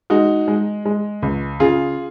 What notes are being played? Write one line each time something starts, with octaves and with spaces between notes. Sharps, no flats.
G#3 D#4 F#4
G#3
G#3
C#2
C#3 F4 G#4